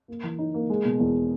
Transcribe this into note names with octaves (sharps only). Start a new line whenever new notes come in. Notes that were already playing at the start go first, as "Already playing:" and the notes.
A#3
E3
D#4
A#3
G#3
B2
E2